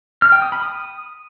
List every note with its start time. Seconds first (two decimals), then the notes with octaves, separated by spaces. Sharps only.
0.22 F6
0.32 G5
0.42 D#6
0.52 B5
0.62 D#6